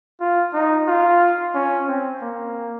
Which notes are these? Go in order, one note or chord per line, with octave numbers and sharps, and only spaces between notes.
F4
D#4
F4
C#4
C4
A#3